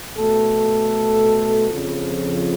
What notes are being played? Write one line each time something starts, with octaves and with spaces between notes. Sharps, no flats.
B2 A3 A4
F2 C#3 F3